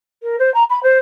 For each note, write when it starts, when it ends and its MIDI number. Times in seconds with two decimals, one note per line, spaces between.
0.22 0.36 70
0.39 0.52 72
0.54 0.63 82
0.69 0.81 83
0.83 0.98 72